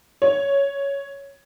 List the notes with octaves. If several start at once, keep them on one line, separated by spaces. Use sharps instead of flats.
C#5